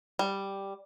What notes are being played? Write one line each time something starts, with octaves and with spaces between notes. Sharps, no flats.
G3